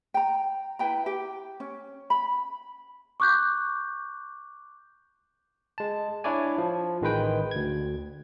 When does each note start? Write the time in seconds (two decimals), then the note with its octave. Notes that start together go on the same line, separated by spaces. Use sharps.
0.14 G5 A#5
0.79 E4 B4 G5 A#5
1.06 G4 G5
1.60 C#4
2.10 B5
3.20 C#6 D6 F#6 G6
5.78 G#3 A5
6.24 D4 E4 C#5 D5 G#5
6.58 F3
7.01 A1 D#3 G#3 B4 G5
7.51 D2 G#6